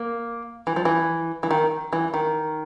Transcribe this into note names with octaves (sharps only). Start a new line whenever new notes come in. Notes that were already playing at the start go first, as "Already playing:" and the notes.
Already playing: A#3
E3
F3
E3
E3
D#3
E3
D#3